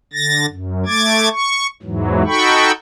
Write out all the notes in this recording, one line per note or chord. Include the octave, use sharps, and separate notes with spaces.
D3 A6 A#6
F#2
A3 D6 G#6 A6
C#6
E2 G#2 E3 F#3
D#4 F#4 A4 G5 B5 C#6